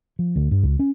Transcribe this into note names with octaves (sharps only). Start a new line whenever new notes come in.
F3
D2
G2
C#2
C#4